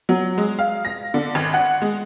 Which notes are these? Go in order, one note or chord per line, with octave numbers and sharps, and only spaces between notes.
F#3
G#3
F5
A#6
D3
G#1
F#5
G#3